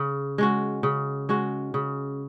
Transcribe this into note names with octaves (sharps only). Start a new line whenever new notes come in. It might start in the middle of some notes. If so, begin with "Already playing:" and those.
Already playing: C#3 C#4
G#3 C#4 F#4
C#3
G#3 C#4 F#4
C#3